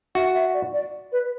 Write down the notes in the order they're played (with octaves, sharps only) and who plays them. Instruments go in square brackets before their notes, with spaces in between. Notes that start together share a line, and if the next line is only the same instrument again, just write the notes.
[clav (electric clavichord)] F#4 [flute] E5
[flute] E5
D5
D5
B4